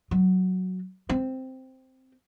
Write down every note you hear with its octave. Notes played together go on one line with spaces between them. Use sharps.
F#3
C4